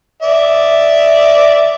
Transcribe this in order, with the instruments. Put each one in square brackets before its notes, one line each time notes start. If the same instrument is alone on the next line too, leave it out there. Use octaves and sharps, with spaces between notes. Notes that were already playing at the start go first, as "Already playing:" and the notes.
[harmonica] D5 E5